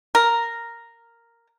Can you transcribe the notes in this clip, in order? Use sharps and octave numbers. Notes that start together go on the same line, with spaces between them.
A#4